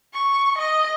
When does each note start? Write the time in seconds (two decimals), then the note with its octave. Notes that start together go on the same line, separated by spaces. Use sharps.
0.14 C#6
0.58 D#5